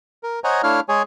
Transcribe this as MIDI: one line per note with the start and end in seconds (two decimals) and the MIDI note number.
0.23 0.40 70
0.44 0.62 72
0.44 0.62 73
0.44 0.62 75
0.44 0.62 78
0.44 0.62 80
0.44 0.62 82
0.63 0.80 57
0.63 0.80 62
0.63 0.80 64
0.63 0.80 73
0.63 0.80 77
0.63 0.80 89
0.89 1.02 56
0.89 1.02 68
0.89 1.02 73
0.89 1.02 80